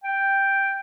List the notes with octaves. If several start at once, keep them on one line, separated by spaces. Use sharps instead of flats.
G5